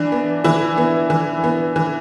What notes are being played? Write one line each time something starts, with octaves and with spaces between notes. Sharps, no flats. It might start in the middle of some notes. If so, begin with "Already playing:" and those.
Already playing: E3 D4
B3
E3 E4
B3
E3
B3
E3